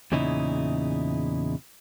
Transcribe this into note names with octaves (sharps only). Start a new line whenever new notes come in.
E2 A#2 C#3 D#4 E4